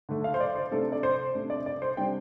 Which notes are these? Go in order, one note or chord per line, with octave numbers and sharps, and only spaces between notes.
D3 A3 D4
F5
C5
D5
C5
C3 A3 D4 A4
D5
C5
C3 A3 D4
D5
D5
C5
C3 G3 D4 G5